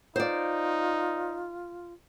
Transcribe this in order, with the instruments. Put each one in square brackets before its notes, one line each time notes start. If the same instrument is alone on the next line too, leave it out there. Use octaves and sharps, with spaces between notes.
[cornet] D#4 [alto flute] F4 [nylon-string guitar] C5 D5